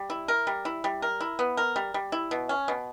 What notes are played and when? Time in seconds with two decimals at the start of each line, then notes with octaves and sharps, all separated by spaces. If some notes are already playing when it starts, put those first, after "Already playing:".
Already playing: G3
0.10 E4
0.28 A#4
0.47 G3
0.65 E4
0.84 G3
1.02 A#4
1.20 E4
1.39 B3
1.57 A#4
1.76 G3
1.94 G3
2.12 E4
2.31 B2
2.49 C#4
2.68 B2